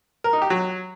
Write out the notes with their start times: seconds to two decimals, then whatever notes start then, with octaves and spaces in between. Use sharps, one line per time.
0.24 A#4
0.33 D#4
0.42 G4
0.50 F#3